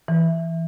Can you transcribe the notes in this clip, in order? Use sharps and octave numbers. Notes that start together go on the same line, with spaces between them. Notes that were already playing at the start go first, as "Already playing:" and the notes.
E3